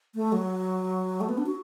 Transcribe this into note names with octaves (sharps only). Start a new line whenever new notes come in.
A3
F#3
A3
B3
D4
F#4